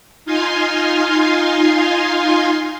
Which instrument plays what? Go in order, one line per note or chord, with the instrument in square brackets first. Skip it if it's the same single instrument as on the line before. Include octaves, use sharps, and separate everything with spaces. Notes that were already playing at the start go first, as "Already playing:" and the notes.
[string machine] D#4 F4 F5 G#5 C6